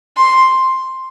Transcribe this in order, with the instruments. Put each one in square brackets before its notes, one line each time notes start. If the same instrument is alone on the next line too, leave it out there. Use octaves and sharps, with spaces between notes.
[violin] C6